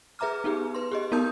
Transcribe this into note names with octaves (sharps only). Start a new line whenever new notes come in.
G#4 B4 E5 A#5 D6 F6
B3 D#4 G4 G#4
B4 C6
G4 G#4 D#5
B3 D#4 A#4 A5 D#6 G6